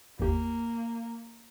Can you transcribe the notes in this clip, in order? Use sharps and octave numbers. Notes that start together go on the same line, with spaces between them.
G#1 E2 A#3 G4